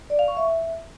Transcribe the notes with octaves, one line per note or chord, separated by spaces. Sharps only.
D5
F5
C#6
E5